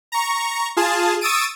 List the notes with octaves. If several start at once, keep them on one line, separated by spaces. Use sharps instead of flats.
A#5 C#6
F4 G#4 A5
C#6 D#6 E6 A6 D7 D#7